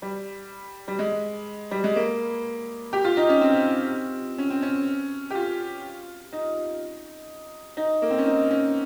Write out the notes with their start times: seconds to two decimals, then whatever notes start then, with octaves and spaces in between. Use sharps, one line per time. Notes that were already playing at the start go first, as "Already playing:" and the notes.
0.02 G3
0.88 G3
0.99 G#3
1.71 G3
1.84 G#3
1.96 A#3
2.93 G4
3.05 F4
3.17 D#4
3.29 C#4
3.41 C4
4.38 C#4
4.50 C4
4.62 C#4
5.30 G4
5.35 F4
6.32 D#4
7.77 D#4
8.02 A#3
8.10 C4
8.18 C#4
8.26 D#4
8.50 C#4